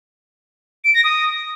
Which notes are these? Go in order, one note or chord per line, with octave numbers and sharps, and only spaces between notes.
D7
A#6
D#6